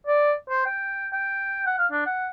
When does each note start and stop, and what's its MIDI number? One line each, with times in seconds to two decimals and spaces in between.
0.07 0.33 74
0.50 0.64 72
0.66 1.07 79
1.13 1.62 79
1.66 1.75 78
1.79 1.87 77
1.92 2.05 62
2.06 2.29 78